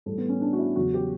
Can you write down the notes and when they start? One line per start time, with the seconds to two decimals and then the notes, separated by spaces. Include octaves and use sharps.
0.06 A2 E3 G3 A4
0.18 B3
0.29 C#4
0.41 D4
0.53 F#4
0.58 E4
0.76 E2 C#3 F#3 F#4
0.94 G4